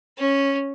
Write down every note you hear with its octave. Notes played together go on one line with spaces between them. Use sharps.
C#4